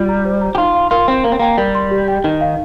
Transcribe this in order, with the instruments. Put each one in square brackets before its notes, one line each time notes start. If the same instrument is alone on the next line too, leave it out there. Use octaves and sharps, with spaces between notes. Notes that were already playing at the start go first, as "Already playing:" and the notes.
Already playing: [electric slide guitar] G3 [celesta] F4
[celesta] A#5
C5
A#5
[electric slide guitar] G4
[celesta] D#4 [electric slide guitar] F4
[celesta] F5
[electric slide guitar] F4 [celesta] A#4
[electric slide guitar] C4 [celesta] C6
[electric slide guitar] A#3 [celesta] A#4
[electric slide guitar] C4
[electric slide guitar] A#3 [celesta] G5
[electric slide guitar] G3 [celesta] A#4
[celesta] C6
G4
G5
[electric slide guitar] D#3 [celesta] D#4
[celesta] F5